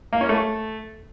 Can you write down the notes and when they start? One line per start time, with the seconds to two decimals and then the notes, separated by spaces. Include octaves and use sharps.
0.13 A#3
0.21 C#4
0.29 A3